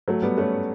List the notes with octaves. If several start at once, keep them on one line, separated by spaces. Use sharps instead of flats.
F#3 A3
G3 B3
A3 C#4